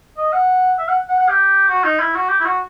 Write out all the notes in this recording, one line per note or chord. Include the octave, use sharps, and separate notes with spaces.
D#5
F#5
E5
F#5
F#5
F#5
G4
F#4
D#4
E4
F#4
G4
E4
F#4